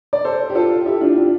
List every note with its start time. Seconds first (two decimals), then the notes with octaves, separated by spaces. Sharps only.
0.13 D5
0.24 A4 C5
0.50 G4
0.55 F4 A4
0.86 E4 G4
1.01 D4 F4
1.17 D4 F4